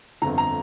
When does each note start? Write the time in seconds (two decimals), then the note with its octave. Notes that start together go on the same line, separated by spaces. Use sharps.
0.22 G1 F2 D3 A#5
0.38 A#5